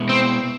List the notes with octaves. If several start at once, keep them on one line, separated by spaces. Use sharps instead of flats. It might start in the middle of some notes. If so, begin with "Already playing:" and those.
Already playing: B2 G#3 B3 E4
C4